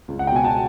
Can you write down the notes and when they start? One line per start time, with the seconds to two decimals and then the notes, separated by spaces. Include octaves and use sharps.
0.08 C#2
0.19 F#5
0.27 G5
0.32 B2 G#5
0.45 A5